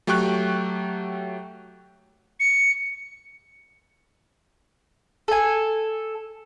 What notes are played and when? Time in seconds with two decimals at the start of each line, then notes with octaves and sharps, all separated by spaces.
0.07 F#3 A3 G4 G5 C#6 F#6
2.40 C#7
5.28 A4 G#5